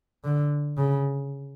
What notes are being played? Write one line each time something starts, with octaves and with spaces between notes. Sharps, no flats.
D3
C#3